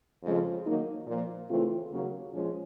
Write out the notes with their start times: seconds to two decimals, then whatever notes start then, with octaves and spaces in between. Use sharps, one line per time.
0.24 F2 C#3 F3 G#3
0.65 D#3 F#3 A#3 D#4
1.07 A#2 F3 A#3
1.49 C#3 E3 A3 C4 F4
1.91 D#2 C#3 F#3 A#3
2.33 A#2 F3 G#3 C#4